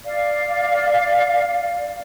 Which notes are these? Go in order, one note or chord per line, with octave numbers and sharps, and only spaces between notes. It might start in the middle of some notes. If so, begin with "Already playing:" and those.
D5 F5